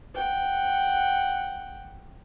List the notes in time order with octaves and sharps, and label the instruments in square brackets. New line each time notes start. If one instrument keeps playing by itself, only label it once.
[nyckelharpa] F#5 G5